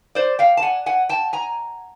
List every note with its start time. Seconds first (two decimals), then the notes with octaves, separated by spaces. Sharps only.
0.15 C5 D5
0.39 F5 G5
0.57 A5
0.62 F#5 G#5
0.86 F#5 G#5
1.09 G5 A5
1.33 G#5 A#5